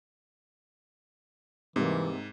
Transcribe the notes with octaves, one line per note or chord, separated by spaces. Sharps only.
G#2 C3 E3 G3 A#3